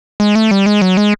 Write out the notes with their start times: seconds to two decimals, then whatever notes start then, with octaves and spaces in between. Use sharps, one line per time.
0.20 G#3
0.35 A3
0.51 G3
0.66 G#3
0.82 F#3
0.97 G#3